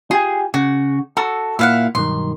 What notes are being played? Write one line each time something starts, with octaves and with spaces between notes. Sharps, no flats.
F4 G4 G#4 G#5
C#3 F#4
F#4 A4
A#2 E4 F5 F#5
B1 G2 D#3 C6